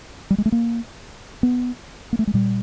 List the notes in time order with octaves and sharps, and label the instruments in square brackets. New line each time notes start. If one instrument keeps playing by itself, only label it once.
[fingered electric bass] G3
G#3
A3
A#3
B3
A#3
A3
G#3
A#2 G3